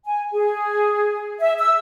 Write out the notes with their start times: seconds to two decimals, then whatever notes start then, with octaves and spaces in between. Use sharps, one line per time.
0.05 G#5
0.32 G#4
1.39 E5
1.59 E6